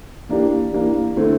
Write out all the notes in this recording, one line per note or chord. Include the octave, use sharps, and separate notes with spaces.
E3 A#3 D4 G4
E3 A#3 D4 G4
D3 A3 C4 E4